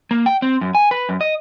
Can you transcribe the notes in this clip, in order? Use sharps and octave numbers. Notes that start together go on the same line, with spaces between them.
A#3
G5
C4
F#2
G#5
B4
F#2
D#5